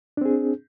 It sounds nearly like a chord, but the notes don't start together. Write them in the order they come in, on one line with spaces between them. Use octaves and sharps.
D4 C4 G#4